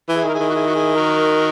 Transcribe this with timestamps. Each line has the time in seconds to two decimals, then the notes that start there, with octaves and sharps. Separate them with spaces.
0.09 E3
0.14 E4 G#4
0.24 D#3 A#4
0.34 E4 G#4
0.40 D#3
0.50 F#4
0.55 E4 G#4
0.66 F#4
0.75 E4 G#4
0.96 F#4 A#4